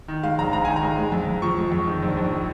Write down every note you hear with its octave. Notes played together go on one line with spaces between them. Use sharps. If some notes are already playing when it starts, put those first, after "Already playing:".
D#3
G#3 F5
A#1 A#5
G#2 A#5
D#3 G#5
A#5
G#3
G#3
F2
F2
F3 C#6
G#3
F2
D#3
A#1
A#1